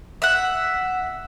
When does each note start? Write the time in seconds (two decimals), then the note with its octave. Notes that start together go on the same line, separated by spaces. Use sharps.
0.22 E5 F#5